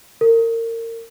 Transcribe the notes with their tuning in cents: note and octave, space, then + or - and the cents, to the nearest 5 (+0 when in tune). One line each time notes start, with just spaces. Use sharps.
A#4 -30